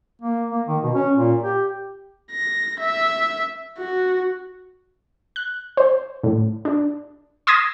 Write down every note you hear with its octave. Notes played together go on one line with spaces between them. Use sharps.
A#3
A#3
D#3
B2
C#4
A#2
G4
A#6
E5
F#4
F#6
C5
A2
D4
C6 D#6 E6 G#6 A#6